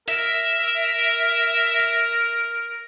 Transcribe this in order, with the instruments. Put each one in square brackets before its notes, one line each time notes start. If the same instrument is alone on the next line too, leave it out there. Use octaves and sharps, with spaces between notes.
[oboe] A#4 [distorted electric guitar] E5